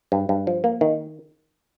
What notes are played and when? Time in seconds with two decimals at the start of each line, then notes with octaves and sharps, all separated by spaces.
0.12 G2
0.29 G2
0.47 F3
0.64 A#3
0.81 D#3